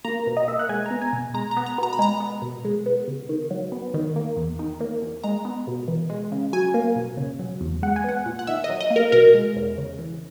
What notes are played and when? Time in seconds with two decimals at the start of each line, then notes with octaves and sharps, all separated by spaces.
0.05 A#3 A#5
0.27 B2
0.37 D#5
0.48 A#3 E5
0.59 F#5
0.69 G#3 G#5
0.86 B3 A#5
1.02 G#5
1.13 B2
1.34 G#3 A#5
1.51 A#5
1.57 B3
1.66 A#5
1.78 B2 A#5
1.93 B5
1.99 G#3 A#5
2.20 B3
2.42 B2
2.65 G#3
2.86 B3
3.08 C#3
3.29 D#3
3.50 F#3
3.72 B3
3.94 D#3
4.16 A#3
4.36 E2
4.59 D#3
4.81 A#3
5.02 E2
5.24 G#3 A#5
5.45 B3
5.67 B2
5.88 E3
6.10 G#3
6.32 C#3
6.53 F#3 G#5
6.74 A#3
6.96 B2
7.17 C#3
7.39 F#3
7.61 E2
7.82 G#3 F#5
7.96 G#5
8.04 B3 F#5
8.26 A#2
8.39 F#5
8.47 D#3 E5
8.64 D#5
8.70 F#3
8.81 D#5
8.90 A#3
8.96 A#4
9.12 B2 A#4
9.35 G#3
9.56 E2
9.78 C#3
9.99 E3